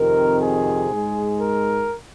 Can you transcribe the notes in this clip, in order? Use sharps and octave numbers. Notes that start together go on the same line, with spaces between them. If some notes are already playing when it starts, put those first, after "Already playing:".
Already playing: F2 C3 D#3 A#4
G#4
G#2 G#3
A#4